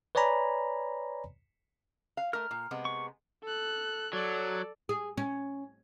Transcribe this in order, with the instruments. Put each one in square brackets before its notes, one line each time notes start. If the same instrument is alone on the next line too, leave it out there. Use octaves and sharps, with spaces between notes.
[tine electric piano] B4 C#5 D5 G#5 A#5 B5
[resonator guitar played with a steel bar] F5
[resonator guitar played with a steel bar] A3 A#4 [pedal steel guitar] F6
[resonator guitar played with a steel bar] A#2
C3 G#3 B3
[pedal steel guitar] C#6
[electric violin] A4 F#6
[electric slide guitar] F#3 [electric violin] A4 D5
[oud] G#4
C#4